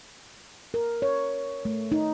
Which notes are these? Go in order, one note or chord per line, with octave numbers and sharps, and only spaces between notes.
A#4
C#5
A3
D#4